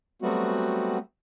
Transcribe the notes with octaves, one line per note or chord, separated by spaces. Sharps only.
F#3 G3 A3 B3 C4 F#4